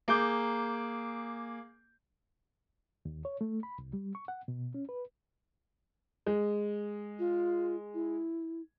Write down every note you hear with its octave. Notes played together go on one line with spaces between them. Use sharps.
A#3 G#4 D6 G6
D#2
C#5
A3
B5
C2
G3
C#6
F#5
B2
C#4
B4
G#3
F4
E4